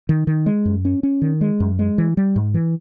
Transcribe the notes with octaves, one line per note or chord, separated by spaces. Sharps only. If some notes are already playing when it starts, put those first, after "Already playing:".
D#3
D#3
G#3
F#2
C#4
C#4
D#3
G#3
F#2
G#3
E3
G3
G#2
E3